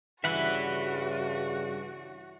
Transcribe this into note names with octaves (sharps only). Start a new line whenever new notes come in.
G2 C#3 E3 F#4 E5 F#5 B5